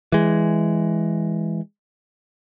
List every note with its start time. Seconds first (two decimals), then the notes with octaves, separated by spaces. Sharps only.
0.12 E3 G#3